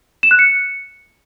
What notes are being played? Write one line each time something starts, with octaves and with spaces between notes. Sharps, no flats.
E7
F#6
C#7